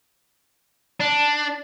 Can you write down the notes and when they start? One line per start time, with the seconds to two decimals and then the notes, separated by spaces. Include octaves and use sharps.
1.00 D4